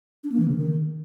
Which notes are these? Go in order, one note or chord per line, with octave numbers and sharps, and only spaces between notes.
D4
A#3
E3
C#3
D#3